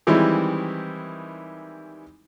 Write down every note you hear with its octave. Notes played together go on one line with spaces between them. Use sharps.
D#3 E3 G3 G#3 C4 E4